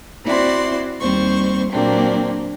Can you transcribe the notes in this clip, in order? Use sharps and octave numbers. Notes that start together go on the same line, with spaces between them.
C4 E4 F#4 D5 C6
D#2 G3 C4 C5 C#6
A#2 F#3 A#3 C4 D4